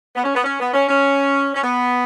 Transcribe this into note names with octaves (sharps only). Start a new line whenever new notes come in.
B3
C#4
B3
C#4
B3
C#4
C#4
C#4
B3